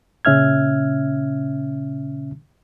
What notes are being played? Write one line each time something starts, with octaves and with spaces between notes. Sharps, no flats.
A#2 C#3 C#4 E5 F6 G#6